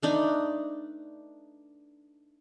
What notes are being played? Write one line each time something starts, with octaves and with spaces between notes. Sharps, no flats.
A3 D4 D#4 B4